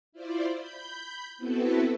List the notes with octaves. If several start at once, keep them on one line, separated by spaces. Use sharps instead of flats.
E4 F4 C5 D5
B5 G6
B3 C4 E4 F#4 A4 B4